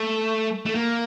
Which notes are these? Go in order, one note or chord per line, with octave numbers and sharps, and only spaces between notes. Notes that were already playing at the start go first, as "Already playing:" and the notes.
Already playing: A3
A3
A#3